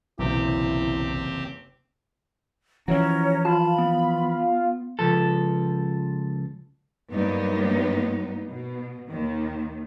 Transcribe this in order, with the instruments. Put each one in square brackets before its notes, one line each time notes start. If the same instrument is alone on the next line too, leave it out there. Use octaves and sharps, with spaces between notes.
[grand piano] F#1 E2 C3 [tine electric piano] B1 [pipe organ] C4 G4 [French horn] E4
[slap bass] E3 F3 [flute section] C#4 C#5 A#5 [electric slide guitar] E4 F#4
[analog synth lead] F4 [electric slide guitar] A5 [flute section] B5
[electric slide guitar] B3
[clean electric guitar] C#2 F3 A4
[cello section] G2 F#3 G3 A#3 B3 D#4
B2
D#2 D#3